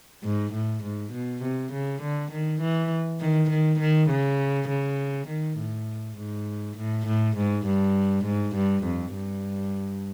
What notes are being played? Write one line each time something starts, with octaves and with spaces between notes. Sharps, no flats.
G#2
A2
G#2
B2
C3
C#3
D3
D#3
E3
D#3
D#3
D#3
C#3
C#3
D#3
A2
G#2
A2
A2
G#2
G2
G#2
G2
F2
G2